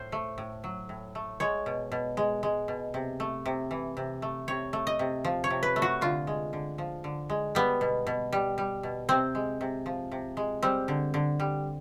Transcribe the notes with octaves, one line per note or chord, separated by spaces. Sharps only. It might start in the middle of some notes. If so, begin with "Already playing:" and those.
Already playing: A2 C5
A3
A2
F#3
A2
A3
G#3 C#5
B2
B2
G#3
G#3
B2
C3
A3
C3
E3
C3
A3
C3 C#5
A3
D#5
C3
F3
C#5
C3
B4
A3
F#4
D3 F4
G#3
D3
F3
D3
G#3
G3 B3
B2
B2
G3
G3
B2
C3 C4
G#3
C3
F3
C3
G#3
G3 C4
D3
D3
G3